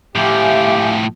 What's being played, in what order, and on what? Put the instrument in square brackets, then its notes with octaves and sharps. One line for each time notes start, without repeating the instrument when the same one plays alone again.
[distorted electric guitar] A2 F3 [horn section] G4 [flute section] E5 F5 G#5